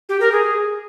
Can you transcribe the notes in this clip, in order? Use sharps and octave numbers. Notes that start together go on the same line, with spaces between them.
G4
A#4
G#4